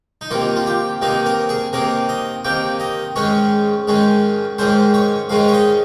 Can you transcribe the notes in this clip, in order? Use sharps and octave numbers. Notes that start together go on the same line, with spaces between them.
D#4
C3 D#3 A#3 F4
F4
G4
C3 D#3 A#3 D#4
A#4
G#4
C3 D#3 A#3 A#4
D#5
C3 D#3 A#3 G5
D#5
G#2 D#3 G#3 C#4 C#5
G#2 D#3 G#3 C#4
G#2 D#3 G#3 C#4 C5
C#5
G#2 D#3 G#3 C#4 F5
C#5
D#5